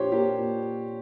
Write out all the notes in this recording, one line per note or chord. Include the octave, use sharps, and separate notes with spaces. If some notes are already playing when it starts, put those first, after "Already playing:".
Already playing: A#2 F3 D4 G4 C5 C#5
A#3 G4
A#2